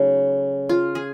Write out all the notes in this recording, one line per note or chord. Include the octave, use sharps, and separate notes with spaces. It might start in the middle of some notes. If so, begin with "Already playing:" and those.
Already playing: C#3 F#3 A3 D#4
F4
G#4